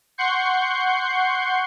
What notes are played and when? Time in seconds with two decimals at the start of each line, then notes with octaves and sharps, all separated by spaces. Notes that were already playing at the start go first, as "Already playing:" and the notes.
0.18 F#5 C6 C#6 G6 C7